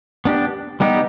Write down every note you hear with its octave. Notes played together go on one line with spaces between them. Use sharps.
B3 D4 G4
G3 B3 D#4 G4